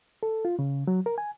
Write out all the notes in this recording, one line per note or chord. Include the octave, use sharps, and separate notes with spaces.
A4
F4
C#3
F#3
A#4
G#5